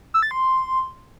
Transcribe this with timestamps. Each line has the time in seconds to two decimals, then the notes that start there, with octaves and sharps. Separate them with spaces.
0.14 E6
0.23 A6
0.31 C6